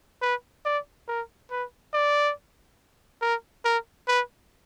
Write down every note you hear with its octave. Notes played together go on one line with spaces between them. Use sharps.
B4
D5
A#4
B4
D5
A#4
A#4
B4